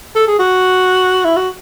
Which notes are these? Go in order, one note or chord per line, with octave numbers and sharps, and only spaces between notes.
A4
G#4
F#4
E4
F#4